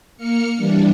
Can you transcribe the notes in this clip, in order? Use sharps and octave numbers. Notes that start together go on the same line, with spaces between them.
A#3 F6 C#7
E3 G3 D4